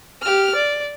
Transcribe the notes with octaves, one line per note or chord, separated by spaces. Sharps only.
G4 F6
D5